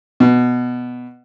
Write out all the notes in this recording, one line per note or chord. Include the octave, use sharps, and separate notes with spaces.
B2